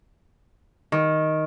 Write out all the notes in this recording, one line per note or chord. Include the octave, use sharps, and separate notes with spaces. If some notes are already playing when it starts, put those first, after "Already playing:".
D#3